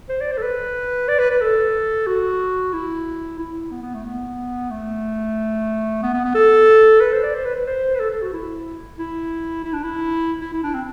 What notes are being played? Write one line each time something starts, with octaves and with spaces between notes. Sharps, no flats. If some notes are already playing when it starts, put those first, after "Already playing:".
C5
D5
C5
A4
B4
D5
B4
B4
A4
F#4
E4
E4
B3
B3
A3
B3
A3
B3
B3
B3
A4
B4
C5
D5
C5
B4
B4
C5
B4
A4
A4
F#4
E4
E4
E4
D4
E4
E4
E4
D4
C4